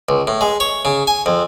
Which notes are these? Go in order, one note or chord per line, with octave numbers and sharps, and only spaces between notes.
C#2
A2
G#3
C#5
C#3
G#5
F2